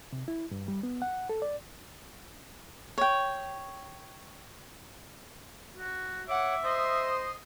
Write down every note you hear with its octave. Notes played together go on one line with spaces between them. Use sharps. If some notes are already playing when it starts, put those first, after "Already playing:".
C3
E4
G2
G3
B3
F#5
A4
D5
C#5 G5
F#4
C#5 E5 F#5 D6
C5 D#5 C6 D#6